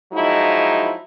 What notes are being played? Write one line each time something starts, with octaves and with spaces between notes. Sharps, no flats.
F3 F#3 G#3 D#4 E4